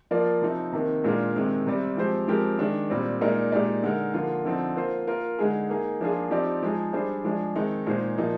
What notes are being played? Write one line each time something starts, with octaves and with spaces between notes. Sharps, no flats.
F3 A#3 F4 A#4 D5
C3 F3 C4 D#4
C3 D#3 A#3 D#4
A#2 G#3 D4 F4 A#4
C3 D#3 G#3 C4
C3 G3 C4
F3 G#3 C4 G4 C5
F3 G#3 C4 G4 A#4
D#3 G#3 D4
A#2 G3 C4
A#2 G#3 D#4 A#4 D5
A#2 G#3 D#4 G4 D5
D3 G#3 D#4 A#4
D3 F3 A#3 F4
D3 F3 C4 D#4
A#3 F4 C5
A#3 F4 A#4
D3 G#3 D#4 G#4
A#3 D#4 G#4
F3 A#3 D4 F4 G#4
F3 C4 D#4 G4 D5
F3 G#3 D#4 G#4
G3 D4 G#4 C5
F3 G#3 D4 G#4
D#3 G#3 C4 D#4
A#2 G#3 D#4 G#4 C5
A#2 F3 A#3 D#4